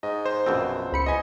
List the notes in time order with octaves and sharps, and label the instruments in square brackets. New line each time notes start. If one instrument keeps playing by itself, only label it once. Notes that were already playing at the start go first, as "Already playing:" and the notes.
[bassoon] G#2 [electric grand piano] D#5
[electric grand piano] C5
[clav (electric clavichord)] A#1 B2 C4 [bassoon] F#2
[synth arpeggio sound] C#2 B5 C#7
[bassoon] E2 [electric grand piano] D#5 G#5